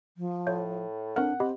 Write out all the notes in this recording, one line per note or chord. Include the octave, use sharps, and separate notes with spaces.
F3
A2 C#5 E5 G6
C4 D4 A#4 F#5 F6
C4 G4 D#5 B5